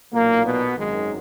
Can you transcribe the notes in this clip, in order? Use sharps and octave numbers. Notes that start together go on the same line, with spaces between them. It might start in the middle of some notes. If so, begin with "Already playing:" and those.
B1 A#2 F#3 A#3
B2 B3
G#1 F#2 D#3 F#3 G#3